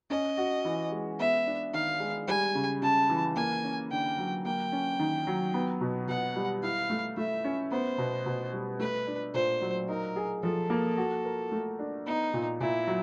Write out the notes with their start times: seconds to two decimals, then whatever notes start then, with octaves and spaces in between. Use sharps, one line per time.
0.10 C#4 D#5
0.37 F#4
0.65 E3
0.92 G#3
1.19 B3 E5
1.46 D4
1.73 D#3 F5
2.00 G#3
2.28 G3 G#5
2.55 C#3
2.82 C#3 A5
3.10 E3
3.36 A#3 G#5
3.64 C#4
3.91 D3 G5
4.18 F#3
4.45 A#3 G5
4.72 C#4
4.99 D#3
5.27 F#3
5.54 B3
5.81 B2
6.08 B2 F#5
6.36 G3
6.62 E4 F5
6.90 A3
7.17 A3 E5
7.44 C#4
7.71 B3 C5
7.98 B2
8.26 B2
8.53 G3
8.79 A3 B4
9.07 D4
9.34 A#2 C5
9.61 F#3
9.89 D#4 A#4
10.16 G#4
10.43 F3 A4
10.70 A#3
10.97 F#4
11.25 A#4
11.52 A3
11.79 D4
12.06 B3 D#4
12.34 A#2
12.60 A#2 E4
12.87 F#3